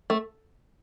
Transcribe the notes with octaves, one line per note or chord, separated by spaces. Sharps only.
A3